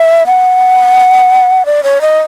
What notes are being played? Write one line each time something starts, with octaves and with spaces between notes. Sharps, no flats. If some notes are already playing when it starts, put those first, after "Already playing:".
Already playing: E5
F#5
D5
C#5
D#5